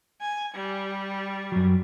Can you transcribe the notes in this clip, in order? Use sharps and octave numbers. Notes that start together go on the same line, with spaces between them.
G#5
G3
F#2 F#3